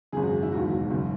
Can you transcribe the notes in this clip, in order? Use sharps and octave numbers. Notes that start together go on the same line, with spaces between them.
G#1 F#2 C#3 G#4
F#4
E4
E1 D#2 D#3 F#3 F#4
F#1 F#2 C#3